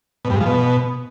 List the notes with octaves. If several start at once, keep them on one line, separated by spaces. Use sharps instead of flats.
B2
G2
G#2
F3
B2